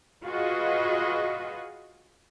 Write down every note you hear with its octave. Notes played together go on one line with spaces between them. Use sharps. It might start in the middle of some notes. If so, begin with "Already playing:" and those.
F4 F#4 G#4 B4 D#5